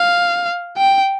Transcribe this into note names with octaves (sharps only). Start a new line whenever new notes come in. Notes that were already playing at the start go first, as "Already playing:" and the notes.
Already playing: F5
G5